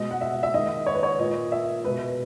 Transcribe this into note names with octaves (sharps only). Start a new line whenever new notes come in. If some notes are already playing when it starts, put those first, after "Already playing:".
Already playing: B2 G#3 D#5
F#5
E5
E5
D#3 G#3 D#5
C#5
B4
C#5
A#2 A#3 D#5
E5
B2 G#3 B4